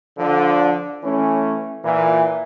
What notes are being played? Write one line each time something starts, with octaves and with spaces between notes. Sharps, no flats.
D3 F3
E3 A3 C#4
A#2 E3